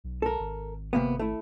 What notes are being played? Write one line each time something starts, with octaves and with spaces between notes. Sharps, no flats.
B1
A4 A#4
G#1
C3 A#3 B3
A3 E4